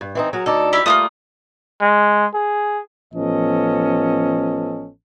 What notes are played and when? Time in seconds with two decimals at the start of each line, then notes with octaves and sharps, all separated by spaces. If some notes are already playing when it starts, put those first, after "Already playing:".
0.01 G2
0.15 E3 C4 D#4
0.33 F#3 G#4 A#4
0.46 D2 D#4 A4 D5
0.73 E4 G4 B5
0.86 G3 A3 A#3 E4 F4 D#6
1.81 G#3
2.34 G#4
3.14 A1 F3 B3 C#4 A4 D#5